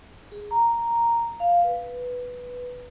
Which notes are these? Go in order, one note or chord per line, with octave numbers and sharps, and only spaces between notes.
G#4
A#5
F5
B4